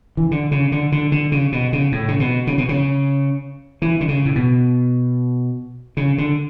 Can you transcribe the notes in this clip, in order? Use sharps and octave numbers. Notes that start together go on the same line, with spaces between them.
E3
D3
C#3
D3
D3
D3
C#3
B2
C#3
A2
C#3
B2
C#3
B2
C#3
E3
D3
C#3
A2
B2
C#3
D3